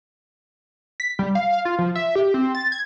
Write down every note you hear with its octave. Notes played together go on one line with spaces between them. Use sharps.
B6
G3
F5
F5
F4
F3
E5
G4
C4
A6
G#6